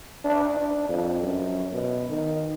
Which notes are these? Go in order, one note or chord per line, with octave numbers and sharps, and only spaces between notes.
D4
D4
F2
F#2
B2
D#3